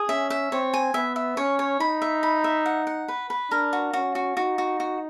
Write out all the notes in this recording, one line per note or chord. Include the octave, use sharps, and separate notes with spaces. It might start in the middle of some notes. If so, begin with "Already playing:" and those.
Already playing: G#4
C#4 E5
E5
C4 C#5
G#5
B3 E5
E5
C#4 C#5
C#5
D#4 B5
E5
B5
E5
F#5
F#5
B4
B4
D4 A#4
F#4
C#4 F#4
F#4
D#4 F#4
F#4
F#4